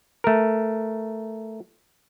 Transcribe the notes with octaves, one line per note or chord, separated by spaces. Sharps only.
A3 A#4